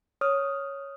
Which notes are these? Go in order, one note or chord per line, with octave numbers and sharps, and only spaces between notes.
C#5 D#6 F6